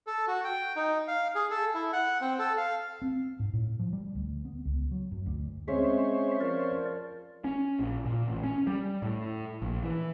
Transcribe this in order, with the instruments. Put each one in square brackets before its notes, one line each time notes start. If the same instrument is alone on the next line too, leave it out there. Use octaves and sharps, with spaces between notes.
[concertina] A4
F#4
G5
D#4
F5
G#4
A4
E4
F#5
C4
A4
F5
[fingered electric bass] C4
G#2
A2
F3
G3
D2
B3
C#2
F#3
F#2
D2
[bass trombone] G#3 [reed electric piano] C4 C#4 G#4 [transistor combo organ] C5 C#5 [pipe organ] E5
[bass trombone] F3 [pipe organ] A#4 D5
[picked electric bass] C#4
A#1
A#2
A1
C#4
G3
A2
A#1
E3